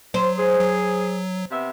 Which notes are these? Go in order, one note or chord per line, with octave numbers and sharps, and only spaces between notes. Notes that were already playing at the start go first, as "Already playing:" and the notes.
F#3 C5
G#4
F#3
C3 B3 E5